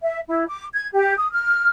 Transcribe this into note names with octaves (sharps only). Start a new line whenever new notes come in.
E5
E4
D6
G#6
G4
D#6
F6